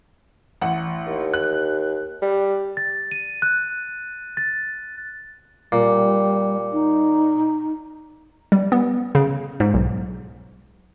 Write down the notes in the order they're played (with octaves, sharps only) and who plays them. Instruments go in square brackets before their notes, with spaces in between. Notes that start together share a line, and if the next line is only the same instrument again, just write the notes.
[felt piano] A1 F#5
[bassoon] D#2
[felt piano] F#6
[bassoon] G3
[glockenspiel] A6
D#7
F#6
A6
[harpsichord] A#2 [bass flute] G3
[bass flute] D#4
[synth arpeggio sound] G3
B3
C#3
G#2
B1